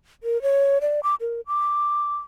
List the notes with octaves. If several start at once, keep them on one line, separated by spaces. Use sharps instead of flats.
A#4
C#5
D5
D6
A#4
D6